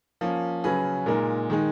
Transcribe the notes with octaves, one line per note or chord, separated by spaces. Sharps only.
F3 A#3 C#4
C#3 F#3 C#4 G#4 B4
A#2 G#3 D#4 A#4
D#3 G#3 D#4